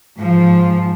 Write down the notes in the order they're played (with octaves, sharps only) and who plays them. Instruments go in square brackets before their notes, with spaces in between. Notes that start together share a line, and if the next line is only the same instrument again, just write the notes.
[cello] G#2 F3